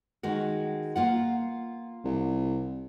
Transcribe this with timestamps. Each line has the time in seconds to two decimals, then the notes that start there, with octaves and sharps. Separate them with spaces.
0.23 D#3 G#3 F#4
0.96 A#3 F4 F#5
2.04 C2